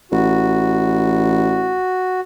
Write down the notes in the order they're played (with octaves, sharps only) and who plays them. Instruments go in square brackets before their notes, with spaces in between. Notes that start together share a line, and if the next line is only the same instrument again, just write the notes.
[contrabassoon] A1 [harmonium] F#4